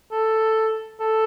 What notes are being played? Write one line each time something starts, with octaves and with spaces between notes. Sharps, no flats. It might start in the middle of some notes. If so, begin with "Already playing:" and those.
A4
A4